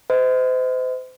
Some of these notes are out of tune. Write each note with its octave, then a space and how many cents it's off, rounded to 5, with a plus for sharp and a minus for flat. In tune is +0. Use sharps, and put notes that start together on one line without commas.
C5 -35 D#5 +30